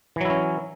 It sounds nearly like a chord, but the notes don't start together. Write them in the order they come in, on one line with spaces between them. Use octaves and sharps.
E3 F#3 E4 C#4